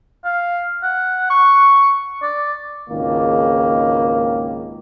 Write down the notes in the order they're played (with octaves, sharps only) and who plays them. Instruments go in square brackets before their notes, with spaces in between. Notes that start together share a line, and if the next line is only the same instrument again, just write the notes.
[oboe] F5
F#5
C#6
D5
[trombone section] G#1 C#2 D#3 A#3